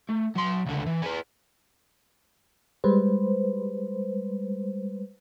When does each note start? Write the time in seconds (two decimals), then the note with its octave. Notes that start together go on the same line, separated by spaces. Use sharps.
0.09 A3
0.35 F#3 C6
0.66 C#2 D3
0.87 E3
1.02 G#4 B4
2.84 G3 G#3 B4 C5